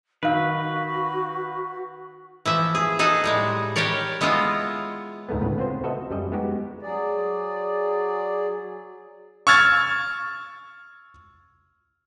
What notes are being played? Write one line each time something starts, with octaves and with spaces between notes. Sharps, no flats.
D#3 F#4 A#4 B4 F5
E3 F3 E5
G#4
D#4 G#4 A4 F#5 G#5
A2 G3 G#3
G4 A#4 B4 C#5 D5
G#3 B3 E4 F4 D#5
D2 G#2 G#3 A3 B3
D2 A2 C#3 B4
B3 C4 F4 C5
F#4 A4 B4 D#5 E5
F#2 G3 D#5
G#3 B3 D#4 F#4 G4
F#3 G#4 D5
C#6 E6 F6 G#6 A6